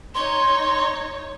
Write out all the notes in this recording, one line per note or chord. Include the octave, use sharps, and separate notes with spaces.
D#4 C#5 C6